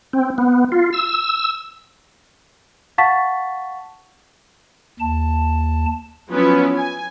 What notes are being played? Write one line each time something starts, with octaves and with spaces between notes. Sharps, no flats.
C4
B3
F4
E6
F5 F#5 A5 C#6 A6 B6
D#2 A5
F3 F#3 B3 C#4 E4 B4
G#5